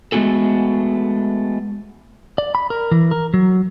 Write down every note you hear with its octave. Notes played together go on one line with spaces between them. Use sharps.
G#3 A3 B3 F#4 G#4 A4
D5
B5
A#4
E3
A#4
F#3